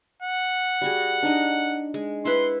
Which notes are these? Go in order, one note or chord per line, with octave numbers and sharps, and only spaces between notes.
F#5
G3 F#4 G#4
D4 D#4 D#5
G#3
E4 B4 F#5 C6